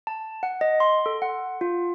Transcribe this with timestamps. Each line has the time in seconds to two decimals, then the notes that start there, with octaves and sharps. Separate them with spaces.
0.07 A5
0.43 F#5
0.61 D#5
0.80 C6
1.06 A4
1.22 F#5
1.61 F4